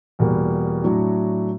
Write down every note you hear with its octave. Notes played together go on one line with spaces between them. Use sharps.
E2 B2 G3 A#3
A2 F#3 A3 D4 F#4